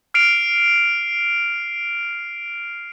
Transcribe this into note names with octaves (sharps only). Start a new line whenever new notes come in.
F6 C7 D7 F7